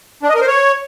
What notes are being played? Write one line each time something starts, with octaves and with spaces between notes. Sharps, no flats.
D4
D#5
A#4
C5
C#5